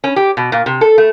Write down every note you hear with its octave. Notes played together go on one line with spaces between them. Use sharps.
C#4
G4
B2
A#2
C3
A4
A3